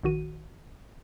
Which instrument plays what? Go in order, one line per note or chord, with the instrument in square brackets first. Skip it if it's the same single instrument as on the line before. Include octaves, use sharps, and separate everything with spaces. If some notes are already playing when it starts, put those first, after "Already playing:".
[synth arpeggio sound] A#1 D#3 F#4 D#7